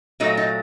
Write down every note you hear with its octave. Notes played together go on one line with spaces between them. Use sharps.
A#2 F#3 A3 D#4
D#4